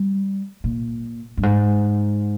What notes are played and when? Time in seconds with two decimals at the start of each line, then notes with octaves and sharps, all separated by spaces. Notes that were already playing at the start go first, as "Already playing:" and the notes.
Already playing: G3
0.64 A#2
1.37 G2
1.43 G#2